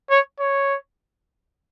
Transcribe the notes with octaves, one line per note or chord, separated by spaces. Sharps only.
C#5
C#5